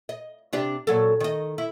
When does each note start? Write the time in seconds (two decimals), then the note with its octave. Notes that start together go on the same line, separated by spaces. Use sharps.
0.09 D#5
0.53 C3 D4 G4
0.87 A#2 F#3 A4
1.20 D#3 D#5
1.58 E4